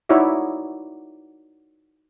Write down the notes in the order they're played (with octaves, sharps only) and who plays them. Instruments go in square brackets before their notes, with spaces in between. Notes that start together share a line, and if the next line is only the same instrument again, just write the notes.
[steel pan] D#4 E4 F#4 C#5 D5 E5